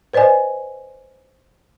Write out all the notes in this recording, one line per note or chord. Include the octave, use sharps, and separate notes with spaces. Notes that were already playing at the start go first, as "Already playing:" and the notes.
B4 C5 D5 D#5 G#5